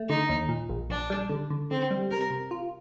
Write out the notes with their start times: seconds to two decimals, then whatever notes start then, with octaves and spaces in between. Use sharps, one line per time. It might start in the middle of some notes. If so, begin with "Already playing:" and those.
Already playing: A3
0.09 D3 D#4
0.29 D#2
0.49 A#2
0.69 A#1
0.90 A#1 D4
1.10 G3
1.29 D3
1.50 D3
1.70 D3 C4
1.91 G3
2.11 C3 A#4
2.31 C3
2.51 F4